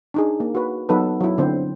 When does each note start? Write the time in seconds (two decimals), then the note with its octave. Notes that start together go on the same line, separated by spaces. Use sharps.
0.14 D4 D#4 G#4
0.40 A#3
0.55 F#4 B4
0.89 F#3 B3 D#4 A4 B4
1.21 F#3 E4
1.38 D3 C4 C5